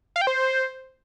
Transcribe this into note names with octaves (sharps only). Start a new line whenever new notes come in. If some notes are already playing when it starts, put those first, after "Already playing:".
F5
G5
C5